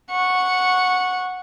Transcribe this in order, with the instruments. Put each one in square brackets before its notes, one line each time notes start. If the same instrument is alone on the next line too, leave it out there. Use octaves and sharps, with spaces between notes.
[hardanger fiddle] F#5 C#6